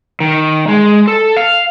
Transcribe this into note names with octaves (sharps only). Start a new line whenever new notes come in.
D#3
G#3
A4
F5